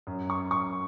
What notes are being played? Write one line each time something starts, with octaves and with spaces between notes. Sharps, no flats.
F#2
C#6
F#2 C#6